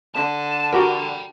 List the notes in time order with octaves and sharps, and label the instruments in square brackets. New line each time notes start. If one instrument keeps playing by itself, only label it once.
[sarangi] D3 [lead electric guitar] A5
[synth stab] F#4 G4 A#4 [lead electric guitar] G5 B5